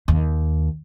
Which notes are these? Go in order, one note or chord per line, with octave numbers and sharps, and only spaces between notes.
D#2